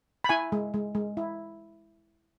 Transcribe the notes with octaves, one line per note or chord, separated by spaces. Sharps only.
B5
E4 G#5
G#3
G#3
G#3
E4